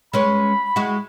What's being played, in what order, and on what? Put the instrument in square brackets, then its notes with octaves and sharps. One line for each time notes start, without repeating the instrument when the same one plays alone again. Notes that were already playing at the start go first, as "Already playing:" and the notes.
[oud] G#3 C#4 B4 [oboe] B5
[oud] G#3 E4 F#4